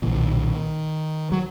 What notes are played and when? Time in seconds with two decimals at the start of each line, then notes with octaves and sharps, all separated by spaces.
0.02 B1 A#2 E3
0.14 D#3
0.37 D#3
1.32 F#3